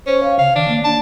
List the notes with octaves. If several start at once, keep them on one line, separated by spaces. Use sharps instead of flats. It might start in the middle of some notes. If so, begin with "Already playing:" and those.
C#4 C5
F5
C#3 F5
D#3 D4
A#3
D4 A5